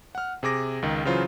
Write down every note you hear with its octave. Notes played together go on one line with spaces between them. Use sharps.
F#5 F6
C3 G#4 D6 A#6
C#2 D#3
C#3 E3 F#3 F4 C5